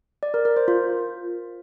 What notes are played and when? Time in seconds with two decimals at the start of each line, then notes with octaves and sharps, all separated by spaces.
0.23 D5
0.34 A#4
0.45 A#4
0.56 C5
0.68 F4